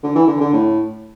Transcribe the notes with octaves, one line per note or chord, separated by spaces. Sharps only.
D3
E3
D3
D3
A2